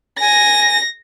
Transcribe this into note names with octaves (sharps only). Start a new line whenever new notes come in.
G#5 A#6